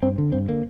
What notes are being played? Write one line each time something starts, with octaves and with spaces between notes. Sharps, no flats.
G2 C4
D3
G2 C4
D3 A#3